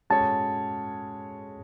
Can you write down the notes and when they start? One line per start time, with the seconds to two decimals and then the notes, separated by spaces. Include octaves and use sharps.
0.10 G#3 C#4 F#4 A4 C#5 A5